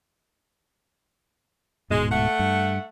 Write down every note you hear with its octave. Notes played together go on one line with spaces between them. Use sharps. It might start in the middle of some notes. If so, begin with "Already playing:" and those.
D1 G#2 B2 G#3
A3 F#5
G2